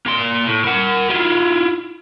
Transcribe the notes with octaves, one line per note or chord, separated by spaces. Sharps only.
A#3 C6
A2
A#4 F#5
E4 F4